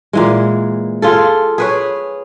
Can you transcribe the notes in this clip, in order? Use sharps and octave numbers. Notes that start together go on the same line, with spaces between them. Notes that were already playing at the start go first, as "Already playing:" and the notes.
A#2 E3 G#3
F4 G#4 A4
G#4 B4 C#5